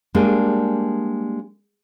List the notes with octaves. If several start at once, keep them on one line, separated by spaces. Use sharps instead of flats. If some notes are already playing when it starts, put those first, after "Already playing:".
G3 G#3 A#3 D4 G#4